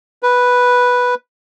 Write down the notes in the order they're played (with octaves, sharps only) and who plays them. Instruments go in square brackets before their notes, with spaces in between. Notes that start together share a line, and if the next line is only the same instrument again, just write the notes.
[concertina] B4